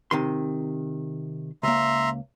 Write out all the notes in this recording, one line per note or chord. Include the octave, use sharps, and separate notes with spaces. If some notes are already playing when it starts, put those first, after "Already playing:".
C3 D#3 C6
C#2 A#3 E5 A#5 C6